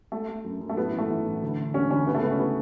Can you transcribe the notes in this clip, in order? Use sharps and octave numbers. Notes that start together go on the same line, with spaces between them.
A3
A3
F#2
F#2
A3
A2 B3
A1
A3
A1
A1
D2
D3
E1 C#4
D2 C#4
C#2 B3
A3
C#2 B3
C#4
E3 B3